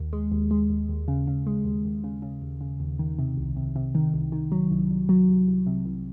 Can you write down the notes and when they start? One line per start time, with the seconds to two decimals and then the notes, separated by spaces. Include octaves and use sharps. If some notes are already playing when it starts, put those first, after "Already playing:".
Already playing: D#2
0.13 G#3
0.32 D#2
0.51 G#3
0.70 D#2
0.89 D#2
1.08 C#3
1.27 C#3
1.47 G#3
1.65 D#2
1.85 D#2
2.04 C#3
2.22 C#3
2.42 D#2
2.61 C#3
2.80 D#2
2.99 D#3
3.19 C3
3.37 C2
3.56 C3
3.76 C3
3.95 D#3
4.14 C2
4.32 D#3
4.52 F#3
4.71 C2
4.91 C2
5.09 F#3
5.29 C2
5.47 C2
5.67 C3
5.85 C2